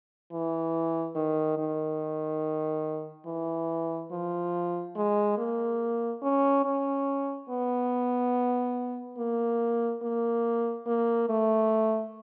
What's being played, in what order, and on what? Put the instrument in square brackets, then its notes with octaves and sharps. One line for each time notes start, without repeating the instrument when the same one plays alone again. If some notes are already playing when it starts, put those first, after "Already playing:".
[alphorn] E3
D#3
D#3
E3
F3
G#3
A#3
C#4
C#4
B3
A#3
A#3
A#3
A3